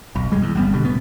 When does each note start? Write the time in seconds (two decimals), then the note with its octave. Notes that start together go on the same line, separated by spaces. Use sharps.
0.15 E1 B1
0.31 F#1 G3 G#3
0.42 E2
0.55 G1 G3 B3
0.73 B2 D3 G3
0.84 E1 A2 B3